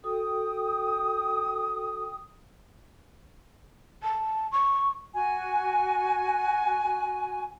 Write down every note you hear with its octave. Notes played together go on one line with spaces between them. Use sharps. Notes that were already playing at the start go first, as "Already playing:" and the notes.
F#4 A4 G5 D#6
A5
C#6
F#4 G#5